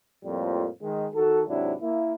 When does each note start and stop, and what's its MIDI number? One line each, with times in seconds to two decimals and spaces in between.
0.25 0.67 41
0.25 0.67 45
0.25 0.67 53
0.25 0.67 55
0.25 0.67 58
0.82 1.07 51
0.82 1.07 56
1.14 1.42 51
1.14 1.42 66
1.14 1.42 69
1.48 1.73 44
1.48 1.73 48
1.48 1.73 54
1.48 1.73 62
1.48 1.73 64
1.81 2.13 58
1.81 2.13 64